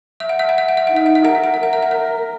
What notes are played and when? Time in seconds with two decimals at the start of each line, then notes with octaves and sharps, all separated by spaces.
0.20 E5
0.29 F#5
0.39 E5
0.49 F#5
0.58 E5
0.68 F#5
0.77 E5
0.87 D#4 F#5
0.96 E5
1.06 F#5
1.15 E5
1.24 A#4 F#5
1.35 E5
1.44 F#5
1.54 E5
1.60 A#4 F#5
1.73 E5
1.83 F#5
1.91 E5